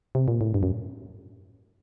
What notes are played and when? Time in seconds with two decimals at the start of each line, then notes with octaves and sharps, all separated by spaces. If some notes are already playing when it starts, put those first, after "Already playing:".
0.15 C3
0.28 A#2
0.41 A2
0.54 G2
0.63 F#2